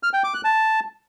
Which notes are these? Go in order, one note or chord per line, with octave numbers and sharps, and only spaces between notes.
F6
G5
D6
F#6
A5